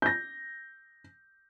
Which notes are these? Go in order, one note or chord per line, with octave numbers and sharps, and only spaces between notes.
G6 A#6